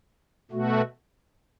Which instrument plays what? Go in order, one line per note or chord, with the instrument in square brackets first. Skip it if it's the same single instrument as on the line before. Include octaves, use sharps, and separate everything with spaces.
[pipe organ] B2 A3 F#4